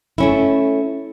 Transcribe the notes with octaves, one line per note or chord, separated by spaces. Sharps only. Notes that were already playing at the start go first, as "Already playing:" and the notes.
A3 C#4 E4